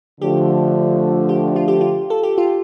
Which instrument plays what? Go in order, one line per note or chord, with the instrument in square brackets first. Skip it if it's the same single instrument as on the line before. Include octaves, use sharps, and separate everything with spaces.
[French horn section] D3 F3 A3 [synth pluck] G4
[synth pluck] G4
F4
G4
F4
A4
G4
F4